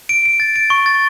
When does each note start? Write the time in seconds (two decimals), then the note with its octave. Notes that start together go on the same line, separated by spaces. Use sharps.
0.09 D7
0.26 D7
0.40 A6
0.56 D7
0.70 C#6
0.86 A6